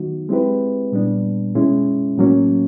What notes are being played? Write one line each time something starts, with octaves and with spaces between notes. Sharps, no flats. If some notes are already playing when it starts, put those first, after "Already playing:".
Already playing: D#3 F#3 B3 D#4 F#4
G#3 C4 E4 G4 B4
A#2 G3 B3 D4
B2 G#3 C#4 E4
A2 F#3 A#3 C#4